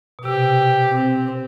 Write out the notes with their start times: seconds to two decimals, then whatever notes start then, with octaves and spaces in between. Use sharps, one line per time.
0.19 B2
0.25 C3 G4
0.93 C4